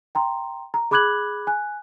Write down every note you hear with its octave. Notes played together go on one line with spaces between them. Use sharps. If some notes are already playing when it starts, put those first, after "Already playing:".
G5 A#5 C6
A#5
G#4 B5 D6 F#6 G#6 F#7
G#5 F#6